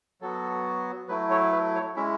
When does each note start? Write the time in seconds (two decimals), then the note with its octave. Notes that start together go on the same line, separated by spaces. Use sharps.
0.21 F#3 B3 F#4 A4
1.08 F#3 A3 E4 B4
1.30 C#5
1.52 B4
1.75 C#5
1.96 G#3 C#4 E4 E5